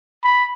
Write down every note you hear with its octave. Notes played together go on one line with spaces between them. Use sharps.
B5